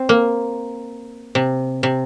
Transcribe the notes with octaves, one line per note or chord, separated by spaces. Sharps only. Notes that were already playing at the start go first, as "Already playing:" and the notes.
Already playing: C4
A#3
C3
C3